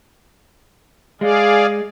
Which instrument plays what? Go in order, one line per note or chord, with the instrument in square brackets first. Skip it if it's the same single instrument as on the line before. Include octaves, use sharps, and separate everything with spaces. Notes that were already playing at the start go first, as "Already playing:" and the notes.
[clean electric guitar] G#3 [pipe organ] G#4 D5 F5